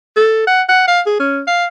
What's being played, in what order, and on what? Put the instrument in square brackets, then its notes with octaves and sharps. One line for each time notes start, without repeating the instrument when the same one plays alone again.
[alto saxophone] A4
F#5
F#5
F5
G#4
C#4
F5